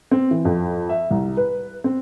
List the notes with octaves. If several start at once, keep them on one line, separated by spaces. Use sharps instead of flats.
C4
E3
F2
E5
C2
B4
C4